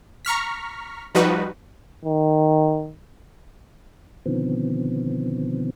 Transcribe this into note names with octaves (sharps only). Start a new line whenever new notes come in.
A#5 C#6 F6 B6
F3 G3 D#4 F#4 B4
D#3
B2 D3 D#3 F3 B3 C4